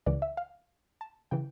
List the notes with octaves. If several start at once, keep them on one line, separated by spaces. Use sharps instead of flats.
C#2 C#3 E3 D5
E5
F5
A5
C#3 E3 G5